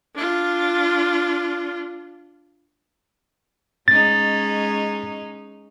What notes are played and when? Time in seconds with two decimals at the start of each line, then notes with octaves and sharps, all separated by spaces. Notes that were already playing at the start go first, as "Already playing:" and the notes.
0.15 D4 F4
3.88 G#3 C#4 D#4 A6